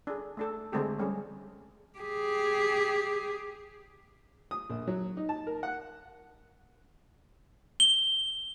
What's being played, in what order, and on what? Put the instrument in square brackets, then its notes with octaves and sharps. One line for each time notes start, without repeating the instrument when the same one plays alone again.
[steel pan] D4 G#4
A3 D4 A4
D3 G#3 A3 C4 G4 A4
F3 G3 C#4 G#4
[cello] G4 G#4
[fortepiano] D#6
A#1
F#3
D#4
A5
A#4
F#5
[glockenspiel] G7